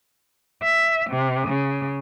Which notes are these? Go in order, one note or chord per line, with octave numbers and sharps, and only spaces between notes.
E5
C3
C#3